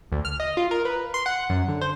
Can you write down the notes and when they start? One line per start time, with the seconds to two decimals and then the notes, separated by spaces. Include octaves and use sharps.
0.12 D2
0.25 F6
0.40 D#5
0.57 F4
0.71 A#4
0.85 B4
1.14 C6
1.26 F#5
1.50 F#2
1.68 D3
1.81 C5